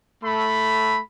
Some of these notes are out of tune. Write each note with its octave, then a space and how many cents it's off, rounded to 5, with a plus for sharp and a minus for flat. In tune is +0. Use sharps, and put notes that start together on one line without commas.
A3 +0 B5 +0